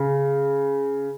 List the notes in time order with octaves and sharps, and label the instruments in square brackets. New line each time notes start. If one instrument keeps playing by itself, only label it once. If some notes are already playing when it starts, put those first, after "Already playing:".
Already playing: [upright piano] C#3